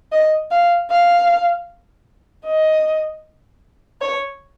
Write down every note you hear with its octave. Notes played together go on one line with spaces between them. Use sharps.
D#5
F5
F5
D#5
C#5